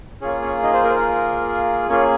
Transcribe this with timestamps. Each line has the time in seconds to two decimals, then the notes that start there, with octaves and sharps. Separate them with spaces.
0.21 A#3 C#4 F4 G#4 C#5
0.42 C#4 C#5
0.63 D#4 D#5
0.73 C5
0.84 A#4
0.90 C5
0.95 A#4
1.89 A#3 C#4 F4 G#4 C#5